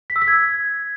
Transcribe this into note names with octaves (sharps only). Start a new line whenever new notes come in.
B6
E6
B6
G#6